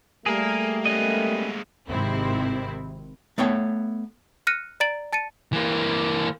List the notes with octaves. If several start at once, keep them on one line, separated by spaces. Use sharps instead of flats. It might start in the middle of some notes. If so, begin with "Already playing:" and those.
G3 A3 A#3 G#4 A#4
G#3 A#3 B3 C#4 D#5
G#1 C3 D#3 C4 E4
A3 B3 C#5 G5
F6 F#6 A#6 C#7 D#7
D5 A#5 A6 D7 F#7
A5 A6 C#7 D#7
E3 A#3